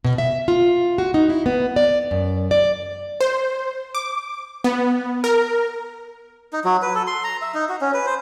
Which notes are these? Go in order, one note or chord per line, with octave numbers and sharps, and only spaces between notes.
B2
E5
F4
F#4
D#4
E4
B3
D5
F#2
D5
C5
D6
B3
A#4
D#4
F#3
B4
A4
C6
A#5
E5
D#4
F#4
C#4
B4
C5